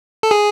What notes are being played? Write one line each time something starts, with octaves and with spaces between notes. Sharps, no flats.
A4
G#4